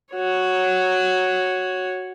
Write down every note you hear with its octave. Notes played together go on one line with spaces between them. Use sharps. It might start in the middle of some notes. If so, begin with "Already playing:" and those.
F#4 C#5